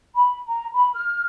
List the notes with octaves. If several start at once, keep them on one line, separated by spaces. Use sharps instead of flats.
B5
A#5
B5
F6